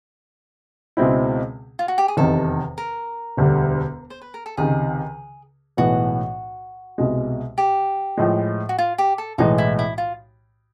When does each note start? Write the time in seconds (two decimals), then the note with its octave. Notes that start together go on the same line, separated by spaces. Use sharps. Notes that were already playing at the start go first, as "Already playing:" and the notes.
0.97 C#2 B2 G#3 C4 E4
1.79 F4
1.88 F#4
1.98 G4
2.08 G#4
2.17 F1 E2 C3 D#3 A4
2.78 A#4
3.37 E1 D2 D3 G3
4.10 C5
4.22 B4
4.34 A#4
4.46 A4
4.57 C#2 C3 D#3 G#4
5.77 B1 A2 E3 G#3 B3 F#4
6.98 C2 B2 G#3
7.58 G4
8.18 A2 F3 G#3
8.69 F#4
8.78 F4
8.98 G4
9.18 A4
9.38 B1 A2 E3 G#3 D#4
9.58 E4
9.79 E4
9.98 F4